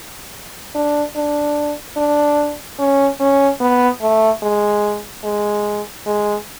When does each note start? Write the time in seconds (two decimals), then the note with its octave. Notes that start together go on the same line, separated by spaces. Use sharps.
0.75 D4
1.15 D4
1.97 D4
2.79 C#4
3.20 C#4
3.60 B3
4.01 A3
4.42 G#3
5.24 G#3
6.06 G#3